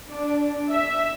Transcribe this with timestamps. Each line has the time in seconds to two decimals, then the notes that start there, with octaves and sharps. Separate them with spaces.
0.11 D4
0.71 E5